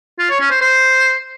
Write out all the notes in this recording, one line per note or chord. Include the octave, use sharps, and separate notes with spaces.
F4
C#5
C#4
C5
C5